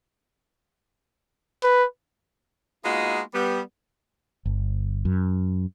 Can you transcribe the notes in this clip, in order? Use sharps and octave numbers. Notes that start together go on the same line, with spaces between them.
B4
G#3 A#3 B3 D#4 F4 F#4
G3 B3
G1
F#2